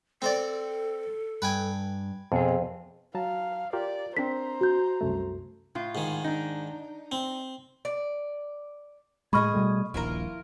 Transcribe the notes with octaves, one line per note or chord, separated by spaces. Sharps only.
C4 A4 C5 D5
G2 B4 G5 G#5
F2 B2 C4 G#4
F#3 F5 A5 A#5
F4 G4 A#4 D5
C4 D4 A#4 C5 A#5 B6
F#4 G6
C2 F#2 A3
A2 F4
G#2 D#3
D4 D#4
C4
D5
A2 G#3 G#4 D#5 G#5 B5 C#6 F6
B2 G3 A3
D#1 A#1 E4 F4 A#4